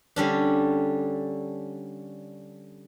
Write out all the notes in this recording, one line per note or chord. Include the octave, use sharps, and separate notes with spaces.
D3 G3 C#4 D4